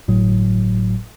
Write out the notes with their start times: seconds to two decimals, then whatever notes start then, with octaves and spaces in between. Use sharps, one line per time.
0.08 G1 A2 F#3